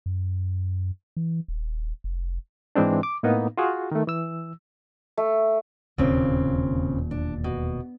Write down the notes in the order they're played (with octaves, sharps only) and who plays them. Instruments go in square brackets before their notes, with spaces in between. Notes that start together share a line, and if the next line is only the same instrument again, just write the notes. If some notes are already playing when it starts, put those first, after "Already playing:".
[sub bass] F#2
E3
D#1
F1
[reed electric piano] G#2 E3 G#3 C4 D4
D6
A2 A#3 B3 D#4
F4 F#4 G#4
D#3 A3
E3 E6
[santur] A3
[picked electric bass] E1 D#2 A#2 [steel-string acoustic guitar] C#3 C4
[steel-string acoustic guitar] D4
B2